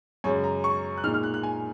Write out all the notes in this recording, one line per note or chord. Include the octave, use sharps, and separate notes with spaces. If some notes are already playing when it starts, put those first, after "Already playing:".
F#2 C#3 G#3 C#5
A#5
C#6
F#6
A#2 G#3 D#4 F6
F6
F#6
F#6
G#5